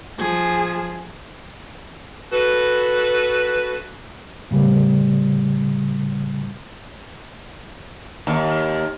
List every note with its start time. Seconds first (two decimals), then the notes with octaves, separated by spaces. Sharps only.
0.19 F3 G#4
2.32 F#4 A4 B4
4.51 A2 C#3 G3
8.27 D#2